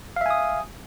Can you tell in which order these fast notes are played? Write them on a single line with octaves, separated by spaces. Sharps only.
F5 E5 G#5 D#6